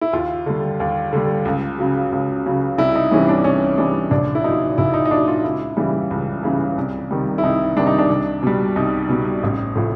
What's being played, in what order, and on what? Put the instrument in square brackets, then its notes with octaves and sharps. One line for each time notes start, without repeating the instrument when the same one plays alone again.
[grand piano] E4
D#2 F4
D3 G3
D#2
D3 G3
C#2
C#3 F#3
C#2
C#3 F#3
C2 E4
D#4
C3 E3 G3 C#4
D4
C2 C#4
C3 E3 G3 D4
A#1 D4
E4
A#2 F#3 D#4
A#1 E4
D#4
D#4
A#2 F#3 D4
F4
C#2 E4
C#3 E3 G3
C#2
C#3 E3 G3
C2
C3 D#3 G3
E4
C2 D#4
C3 D#3 G3 D4
D#4
D4
C2
B2 G3
C2 D#4
B2 G3
A1
A2 F3